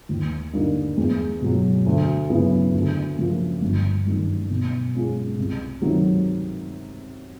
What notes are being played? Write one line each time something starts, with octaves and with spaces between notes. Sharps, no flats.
D#2
D3 G3 A#3 D#4
E2
B2 F#3
D2
C#3 F#3 B3 E4
D2
C#3 F3 A#3
G1
F#2 D#3 G3
B2
G#3 C#4 F4 G#4
C2
C3 D#3 F#3 A3